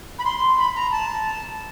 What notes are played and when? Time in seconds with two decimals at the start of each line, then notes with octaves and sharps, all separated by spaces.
0.19 B5
0.25 C6
0.58 B5
0.75 A#5
0.92 A5